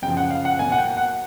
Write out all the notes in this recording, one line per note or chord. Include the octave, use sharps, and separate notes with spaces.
F#2 C#3 F3 G5
F#5
F5
F#5
B2 F#3 A#3 G#5
F#5
G5
F#5